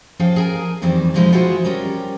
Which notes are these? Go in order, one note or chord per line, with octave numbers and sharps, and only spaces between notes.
F3 C#4 G#4 E5 F5 G5
G#4 A#4 G#5
F2 D#3 E3 G3 C4
B2 E3 F3 G#3 D#4 E4
F4 F#4 G#4 B4 C5 E5
G3 C#4 G4 A#4